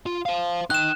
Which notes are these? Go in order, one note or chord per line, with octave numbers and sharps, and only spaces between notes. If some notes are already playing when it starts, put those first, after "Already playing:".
F4
C5 F5
D#4 G5 F#6 E7